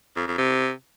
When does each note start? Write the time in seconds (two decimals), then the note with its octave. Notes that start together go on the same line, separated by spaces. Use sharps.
0.16 F2
0.27 F2
0.38 C3